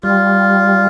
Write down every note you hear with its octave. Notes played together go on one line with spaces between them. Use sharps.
G3 F4